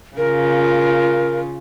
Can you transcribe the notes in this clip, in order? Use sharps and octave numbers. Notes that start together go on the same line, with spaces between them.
C#3 F4 A#4